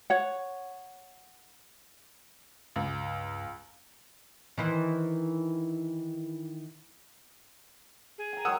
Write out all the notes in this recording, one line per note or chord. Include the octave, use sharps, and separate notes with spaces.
C#5 F#5
C#2 G2
D#3 E3 C5
G#4
G5 A#5
D#3 F#3 G#3 F#5 D#6 E6